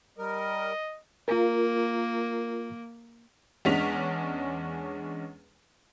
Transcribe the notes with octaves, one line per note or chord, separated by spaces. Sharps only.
G3 A#4 D#5
A#3 F4 A#4
E2 G#3 C#4 D4 B6 F7